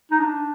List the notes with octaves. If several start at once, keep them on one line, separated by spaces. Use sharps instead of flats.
D#4
D4